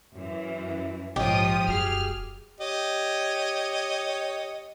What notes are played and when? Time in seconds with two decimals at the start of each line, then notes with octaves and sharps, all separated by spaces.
0.14 F#2 E3
1.16 A#1 G#2 F3 G4 C#5 D#5 D#6
1.67 E1 F#2 F#4 G#4 F6 C7
2.60 G4 C#5 D#5